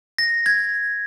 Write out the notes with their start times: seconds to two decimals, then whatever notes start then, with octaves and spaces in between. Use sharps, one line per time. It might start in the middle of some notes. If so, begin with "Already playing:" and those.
0.18 A#6
0.46 G#6